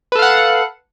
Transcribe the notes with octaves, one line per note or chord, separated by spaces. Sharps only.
A4 B4 F5 F#5